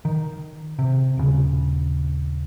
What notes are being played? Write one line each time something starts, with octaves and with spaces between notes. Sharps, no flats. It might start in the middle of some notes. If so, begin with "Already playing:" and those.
D#3
C3
D#1 C#3